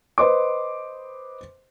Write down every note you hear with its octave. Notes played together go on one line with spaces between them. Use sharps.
B4 C5 D#5 C6 D6